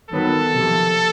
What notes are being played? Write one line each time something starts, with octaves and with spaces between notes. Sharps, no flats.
D#3 F#3 B3 A4
C3 F3 A#3